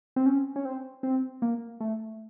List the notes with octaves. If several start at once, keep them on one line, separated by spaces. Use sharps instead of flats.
C4
C#4
C#4
C4
C4
A#3
A3